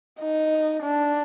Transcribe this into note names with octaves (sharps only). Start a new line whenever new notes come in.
D#4
D4